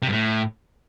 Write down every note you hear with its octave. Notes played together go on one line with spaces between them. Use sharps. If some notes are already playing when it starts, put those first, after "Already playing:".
C3
G2
A2